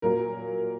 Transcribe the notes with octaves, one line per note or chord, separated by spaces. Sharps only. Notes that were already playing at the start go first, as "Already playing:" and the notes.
A#2 F#3 A#3 A#4